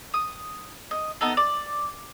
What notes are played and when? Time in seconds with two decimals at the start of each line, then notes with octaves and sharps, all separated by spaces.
0.14 D#6
0.91 D#5
1.21 B3 D#4 A4
1.37 D5